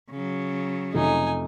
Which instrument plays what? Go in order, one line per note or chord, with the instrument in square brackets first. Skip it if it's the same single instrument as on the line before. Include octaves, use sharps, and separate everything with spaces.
[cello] C#3 F#3
[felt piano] F2 C3 A3 [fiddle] D#4 G#5